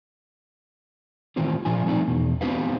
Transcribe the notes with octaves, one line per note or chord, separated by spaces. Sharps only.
A2 D#3 E3 C4 F4 G4
A#2 F3 D4 F4 G#5
F3 A3 C4 D#4 D5
E2 B2
B3 C4 D4 G4 B4 F5